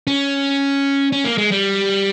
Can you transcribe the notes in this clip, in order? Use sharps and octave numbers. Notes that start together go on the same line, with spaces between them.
C#4
C#4
A#3
G#3
G3